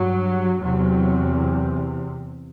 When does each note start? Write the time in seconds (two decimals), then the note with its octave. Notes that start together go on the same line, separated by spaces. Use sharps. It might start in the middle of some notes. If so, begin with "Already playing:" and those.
Already playing: G2 F#3
0.61 E2 C3 F#3